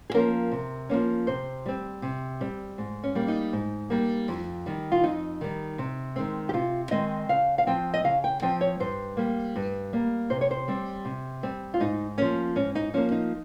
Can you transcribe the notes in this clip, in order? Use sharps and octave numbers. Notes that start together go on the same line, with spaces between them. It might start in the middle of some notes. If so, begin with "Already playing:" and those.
G#4
F3 A#3 C#4 A#4
C3
F3 A#3 C#4
C3 C5
G3 C4
C3
G3 C4
G#2
C#4
G3 A#3
D#4
G#2
G3 A#3
F2
D#3 G3
F4
F2 D#4
D#3 G3
C3
D#3 G#3 C4
G4
C3 F4
D#3 G#3 C4 D#5
C#3 F5
F5
F3 C4 G5
D#5
C#3 F5
G5
F3 C4 G5
C#5
G2 C5
G3 A#3
G2
G3 A#3
C3 C5
C#5
C5
G3 C4
C3
G3 C4
F4
G#2 D#4
F3 A#3 C#4
G#2 C#4
D#4
F3 A#3 C#4
D#4